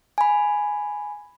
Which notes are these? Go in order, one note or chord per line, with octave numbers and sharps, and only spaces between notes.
G#5 B5